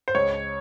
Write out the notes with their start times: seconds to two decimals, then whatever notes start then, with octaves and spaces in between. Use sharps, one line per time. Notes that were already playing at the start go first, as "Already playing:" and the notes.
0.08 C5
0.14 C#2 C#5